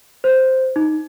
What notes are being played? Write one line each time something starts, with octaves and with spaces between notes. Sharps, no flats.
C5
D#4